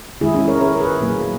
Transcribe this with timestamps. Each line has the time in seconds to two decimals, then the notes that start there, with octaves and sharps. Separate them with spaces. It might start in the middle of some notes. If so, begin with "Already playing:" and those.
0.21 D#3 G#3 E4 G#4
0.35 C#4 E4
0.48 A#4 C#5
0.61 A#4 C#5
0.80 G#4 B4
1.00 A#2 F#3 A#3